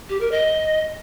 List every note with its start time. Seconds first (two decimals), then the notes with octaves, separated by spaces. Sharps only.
0.09 G4
0.20 A#4
0.32 D#5